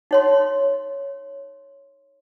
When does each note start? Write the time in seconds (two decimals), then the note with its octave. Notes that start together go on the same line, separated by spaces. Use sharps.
0.11 D#4 C#5 C6